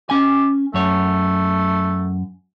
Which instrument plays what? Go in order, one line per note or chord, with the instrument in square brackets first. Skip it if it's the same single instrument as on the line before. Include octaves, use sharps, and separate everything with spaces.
[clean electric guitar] C#4 G#5 [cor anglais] G4
[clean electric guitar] F#2 C#5 [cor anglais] A3